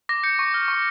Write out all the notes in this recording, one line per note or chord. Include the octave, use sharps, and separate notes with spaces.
D6 A#6
G6 C#7
C#6
F6
C#6